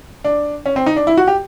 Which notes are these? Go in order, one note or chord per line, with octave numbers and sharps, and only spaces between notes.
D4
C#4
C4
D#4
D4
E4
F#4
G4